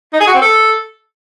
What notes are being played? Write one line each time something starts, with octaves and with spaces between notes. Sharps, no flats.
D#4
G#4
F#4
C4
A4